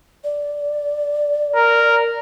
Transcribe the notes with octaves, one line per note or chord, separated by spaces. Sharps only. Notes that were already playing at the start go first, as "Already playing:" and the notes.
D5
A#4